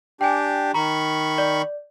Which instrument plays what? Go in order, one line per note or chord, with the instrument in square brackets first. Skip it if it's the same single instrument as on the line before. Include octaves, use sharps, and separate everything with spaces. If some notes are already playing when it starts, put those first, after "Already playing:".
[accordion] D4 G4 [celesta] G5 G#5
[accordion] D#3 B5 C#6 [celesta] A#5
[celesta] D5